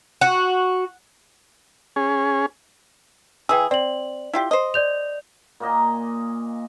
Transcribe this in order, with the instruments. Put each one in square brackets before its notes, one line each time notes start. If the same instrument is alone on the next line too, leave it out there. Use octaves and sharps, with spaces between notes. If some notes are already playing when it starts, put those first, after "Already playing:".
[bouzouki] F#4
[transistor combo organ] C#4 G#4
[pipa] E3 G#4 [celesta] G5 E6
[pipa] C4 [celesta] D5 F#7
[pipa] E4 F4 G4
C5 D#5
[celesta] D5 G6 F7
[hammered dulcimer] A#2 A#3 D#5 G#5